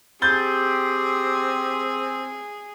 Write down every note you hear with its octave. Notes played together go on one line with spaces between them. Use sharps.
C4 G4 G#4 G6 A6 G7